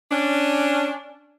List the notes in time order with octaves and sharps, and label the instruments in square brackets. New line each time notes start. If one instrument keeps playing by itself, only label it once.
[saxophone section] C#4 D4